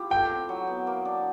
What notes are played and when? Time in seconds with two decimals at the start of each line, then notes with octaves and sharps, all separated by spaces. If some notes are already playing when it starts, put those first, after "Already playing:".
Already playing: E4 F4 G4
0.10 A3 G5
0.30 C4
0.49 F#3
0.67 B3
0.87 A#3
1.05 D4